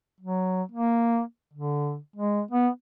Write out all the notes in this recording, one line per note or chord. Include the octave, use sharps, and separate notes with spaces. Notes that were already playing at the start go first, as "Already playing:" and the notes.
F#3
A#3
D3
G#3
B3